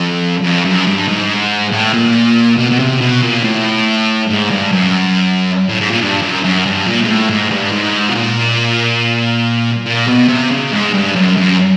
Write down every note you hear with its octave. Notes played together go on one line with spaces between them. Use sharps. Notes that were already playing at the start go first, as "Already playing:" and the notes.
Already playing: F2
F2
F#2
G2
G#2
A2
A#2
B2
B2
C3
B2
A#2
A2
G#2
G2
F#2
A2
G#2
A#2
G2
F#2
F#2
G2
A#2
G#2
A2
G#2
G2
G#2
B2
A#2
A#2
B2
C3
C#3
G#2
G2
F#2
F#2